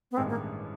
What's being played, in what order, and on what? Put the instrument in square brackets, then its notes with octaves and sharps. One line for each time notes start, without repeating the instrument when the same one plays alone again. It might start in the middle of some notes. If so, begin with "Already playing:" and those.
[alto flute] B3
[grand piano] A1 G2 D#3 G#3 C#4 [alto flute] C4
[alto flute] A#3